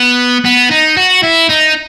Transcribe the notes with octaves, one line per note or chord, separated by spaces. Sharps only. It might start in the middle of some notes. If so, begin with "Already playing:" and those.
Already playing: B3
B3
D#4
F#4
E4
D#4